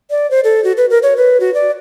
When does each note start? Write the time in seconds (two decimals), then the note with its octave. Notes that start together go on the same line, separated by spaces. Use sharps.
0.11 D5
0.31 C5
0.44 A4
0.64 F#4
0.77 B4
0.90 A#4
1.03 C#5
1.17 B4
1.40 F#4
1.54 D5